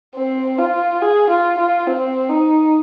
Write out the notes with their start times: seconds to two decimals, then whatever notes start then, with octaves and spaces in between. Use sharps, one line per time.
0.16 C4
0.59 F4
1.02 G#4
1.30 F4
1.58 F4
1.87 C4
2.29 D#4